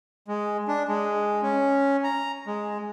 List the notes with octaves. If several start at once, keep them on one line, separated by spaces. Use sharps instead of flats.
G#3
D4
G#3
C#4
A#5
G#3